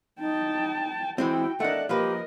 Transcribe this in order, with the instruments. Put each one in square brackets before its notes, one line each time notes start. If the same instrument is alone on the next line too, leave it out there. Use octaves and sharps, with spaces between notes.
[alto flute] D#4 [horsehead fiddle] G5 A5
[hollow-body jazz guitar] E3 G#3 C4 [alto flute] E4 [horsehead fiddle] F#4 G5
[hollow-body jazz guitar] A3 D4 [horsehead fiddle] A#4 F#5 [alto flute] D#5
[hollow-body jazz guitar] F3 A#3 B4 [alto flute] G4 [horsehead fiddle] A#4 D#5